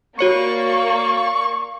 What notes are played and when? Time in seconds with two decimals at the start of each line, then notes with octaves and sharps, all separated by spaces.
0.19 A#3 F#4 C#5 D5 C#6 C#7